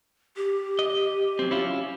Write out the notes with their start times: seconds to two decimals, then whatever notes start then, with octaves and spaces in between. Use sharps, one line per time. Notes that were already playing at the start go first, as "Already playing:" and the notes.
0.37 G4
0.79 D#5
1.39 F#3 C4
1.51 C#4 E4 F4